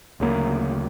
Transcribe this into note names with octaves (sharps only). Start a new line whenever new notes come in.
D2 C#3 F#3 A#3